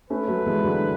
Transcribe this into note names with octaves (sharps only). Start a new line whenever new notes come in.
A3 C#4 B4
F#3 A3
E3 G#3
D3 F#3